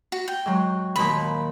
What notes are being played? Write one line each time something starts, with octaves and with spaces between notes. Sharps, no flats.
F#4
G5
G#2 F#3
D#2 A#2 F3 B5